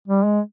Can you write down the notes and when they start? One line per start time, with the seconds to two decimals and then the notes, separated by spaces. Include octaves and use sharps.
0.08 G3
0.24 G#3